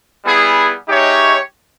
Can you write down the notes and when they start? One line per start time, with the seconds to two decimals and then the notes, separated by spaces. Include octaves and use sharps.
0.24 G3 B3 E4 G#4
0.87 G#3 D#4 G4 C#5 E5